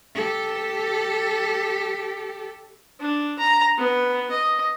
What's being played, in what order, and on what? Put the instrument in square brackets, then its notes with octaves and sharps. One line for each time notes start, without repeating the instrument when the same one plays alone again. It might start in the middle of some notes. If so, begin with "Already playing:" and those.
[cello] G4 A4
[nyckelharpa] D4
A#5
B3
D#5